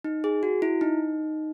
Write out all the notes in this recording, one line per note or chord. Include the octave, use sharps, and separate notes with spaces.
D#4
G#4
F#4
E4
D#4